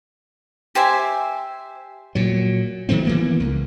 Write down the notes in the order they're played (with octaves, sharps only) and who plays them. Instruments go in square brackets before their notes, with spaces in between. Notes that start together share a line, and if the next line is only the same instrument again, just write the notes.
[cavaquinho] G4 C5 E5 G#5
[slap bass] A#2 F#3
D#3 E3 A3 C4
E3 A#3 B3
C#2